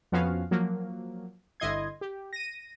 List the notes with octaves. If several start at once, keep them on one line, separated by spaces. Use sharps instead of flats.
F2 F3 B3 C#4 F#4 F5
F3 F#3 A#3
G1 D3 E4 D#5 C6 G#6
G4
A#6 D#7